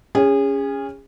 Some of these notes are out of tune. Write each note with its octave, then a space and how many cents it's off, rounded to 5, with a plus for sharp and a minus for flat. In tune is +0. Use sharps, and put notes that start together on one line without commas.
C#4 +10 G#4 -30